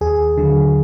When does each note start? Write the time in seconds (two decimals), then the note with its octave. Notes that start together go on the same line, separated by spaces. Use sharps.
0.01 D#2 G#4
0.37 D3 F#3